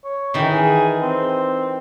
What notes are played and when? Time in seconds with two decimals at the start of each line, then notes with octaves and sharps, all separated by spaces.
0.05 C#5
0.34 D#3 E3
0.53 G#4
1.02 C4